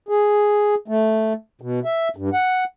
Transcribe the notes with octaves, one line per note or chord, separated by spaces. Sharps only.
G#4
A3
B2
E5
G2
F#5